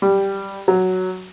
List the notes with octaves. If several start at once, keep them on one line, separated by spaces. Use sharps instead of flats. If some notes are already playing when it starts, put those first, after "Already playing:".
G3
F#3